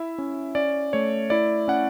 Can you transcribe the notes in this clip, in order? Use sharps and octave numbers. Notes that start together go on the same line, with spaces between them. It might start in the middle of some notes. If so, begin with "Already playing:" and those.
Already playing: E4 E5
C#4
C#4 D5
A3 C#5
E4 D5
C#4 F#5